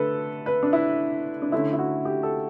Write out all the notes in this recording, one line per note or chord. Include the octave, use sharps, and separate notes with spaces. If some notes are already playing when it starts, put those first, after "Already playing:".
Already playing: D3 A3 A4 B4
B4
D4
E4
D4
D3 A3 C#4 E4
E4
F#4
G4
A4